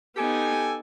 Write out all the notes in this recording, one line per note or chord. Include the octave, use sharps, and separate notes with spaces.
B3 D#4 G4 A4 G#5